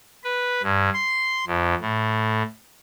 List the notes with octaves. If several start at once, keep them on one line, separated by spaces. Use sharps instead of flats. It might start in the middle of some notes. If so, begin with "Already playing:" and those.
B4
G2
C6
F2
A2